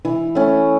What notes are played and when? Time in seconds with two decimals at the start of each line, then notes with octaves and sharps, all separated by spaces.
0.05 E3
0.35 A3 C#4